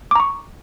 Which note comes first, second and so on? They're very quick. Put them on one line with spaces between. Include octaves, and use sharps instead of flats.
D6 A#5 C#6